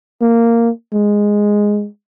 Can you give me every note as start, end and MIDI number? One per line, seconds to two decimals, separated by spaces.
0.22 0.70 58
0.93 1.87 56